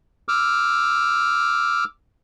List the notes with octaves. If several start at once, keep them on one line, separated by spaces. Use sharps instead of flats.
D6 E6 F6